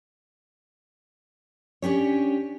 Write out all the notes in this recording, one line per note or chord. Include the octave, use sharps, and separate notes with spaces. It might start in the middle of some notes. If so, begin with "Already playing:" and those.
C#4 D4 G4 C#5